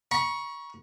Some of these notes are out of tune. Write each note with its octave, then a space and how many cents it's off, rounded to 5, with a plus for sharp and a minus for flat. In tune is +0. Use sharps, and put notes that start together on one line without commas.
A#5 +45 C#6 +0